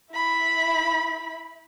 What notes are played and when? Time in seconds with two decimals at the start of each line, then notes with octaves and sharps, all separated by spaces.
0.13 E4 B5